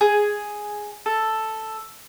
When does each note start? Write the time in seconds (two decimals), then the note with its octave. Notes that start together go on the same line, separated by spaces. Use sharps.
0.01 G#4
1.06 A4